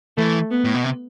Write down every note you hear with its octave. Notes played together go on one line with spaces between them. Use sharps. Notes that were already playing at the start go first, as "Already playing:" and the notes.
E3 A3
B3
A2
B2
C3